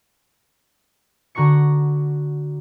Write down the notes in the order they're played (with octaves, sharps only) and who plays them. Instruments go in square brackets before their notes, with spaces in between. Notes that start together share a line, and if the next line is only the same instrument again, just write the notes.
[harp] D3 F#4 A#5 C#6 C#7